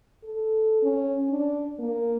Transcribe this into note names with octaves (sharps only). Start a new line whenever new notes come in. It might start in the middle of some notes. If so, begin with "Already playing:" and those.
A4
C#4
D4
A#3